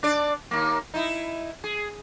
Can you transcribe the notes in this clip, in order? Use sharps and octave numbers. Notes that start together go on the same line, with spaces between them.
D4 D5
D#2 A#3
D#4 E4
G#4